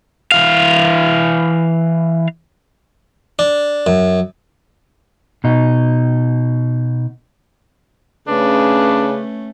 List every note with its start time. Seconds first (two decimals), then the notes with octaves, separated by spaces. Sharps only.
0.32 E3 F5
3.39 D4
3.87 F#2
5.44 B2 D#4
8.28 C#3 A3 C#4 D4 B4